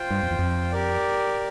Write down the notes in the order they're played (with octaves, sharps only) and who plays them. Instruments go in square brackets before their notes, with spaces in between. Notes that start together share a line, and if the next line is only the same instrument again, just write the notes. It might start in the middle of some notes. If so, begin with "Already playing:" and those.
Already playing: [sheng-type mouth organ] F4 C5 G5
[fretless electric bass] G2
F2
E2
F2
[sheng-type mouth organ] G4 A#4 D5